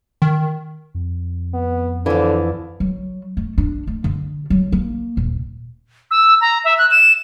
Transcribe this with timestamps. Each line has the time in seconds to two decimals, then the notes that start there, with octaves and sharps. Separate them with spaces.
0.22 D#3
0.95 F2
1.54 B3
2.06 D3 E3 F3
2.80 F#3
3.37 A3
3.58 D4
3.87 A3
4.04 D3
4.50 F#3
4.72 A#3
5.17 D#1
6.11 E6
6.41 A#5
6.64 E5
6.78 F#6
6.91 E7